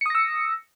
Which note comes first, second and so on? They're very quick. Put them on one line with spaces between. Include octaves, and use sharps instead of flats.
C#7 D#6 A#6 E6